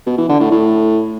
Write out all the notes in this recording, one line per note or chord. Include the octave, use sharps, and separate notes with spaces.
B2
E3
D3
A2
A2